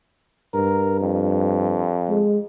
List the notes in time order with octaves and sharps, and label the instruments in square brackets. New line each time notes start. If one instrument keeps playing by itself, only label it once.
[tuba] G2 [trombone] A#4
[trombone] F2
[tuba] G#3